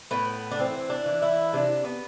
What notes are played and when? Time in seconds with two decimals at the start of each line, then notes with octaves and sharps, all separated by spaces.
0.11 A2 B3
0.51 D4
0.59 E3 C4
0.90 D4
1.06 E3
1.22 E4
1.53 C3 D4
1.85 B3